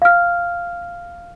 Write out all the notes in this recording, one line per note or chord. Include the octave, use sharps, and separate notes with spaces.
F5 F6